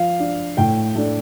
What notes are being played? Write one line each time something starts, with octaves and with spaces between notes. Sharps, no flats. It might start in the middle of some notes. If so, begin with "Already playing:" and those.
Already playing: F3 F5
D4
A2 G5
A3 D4